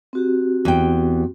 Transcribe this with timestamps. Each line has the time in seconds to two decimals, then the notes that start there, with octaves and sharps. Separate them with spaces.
0.13 C4 F#4 G4
0.65 E2 G5